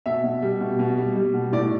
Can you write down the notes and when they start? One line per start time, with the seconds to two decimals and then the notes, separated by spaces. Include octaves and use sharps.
0.06 B2 E5
0.24 B2
0.42 G3
0.61 B2
0.79 B2
0.97 G3
1.16 G3
1.34 B2
1.52 A2 D5